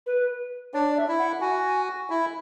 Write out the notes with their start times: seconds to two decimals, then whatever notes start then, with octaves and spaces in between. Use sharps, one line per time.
0.06 B4
0.74 D4 C#5
0.90 D5
0.97 E5
1.08 E4
1.19 F#5
1.41 F#4 G#5
2.10 E4